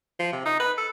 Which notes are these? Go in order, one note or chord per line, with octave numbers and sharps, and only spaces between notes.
F3
C3
D#4
B4
A4